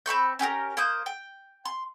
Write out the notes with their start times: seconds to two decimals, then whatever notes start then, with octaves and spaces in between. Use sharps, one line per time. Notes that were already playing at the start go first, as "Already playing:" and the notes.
0.06 C4 B5 C#6 G6
0.39 C#4 G4 G#4 A#4
0.77 A#3 C5 D#6 G6
1.06 G5
1.65 C6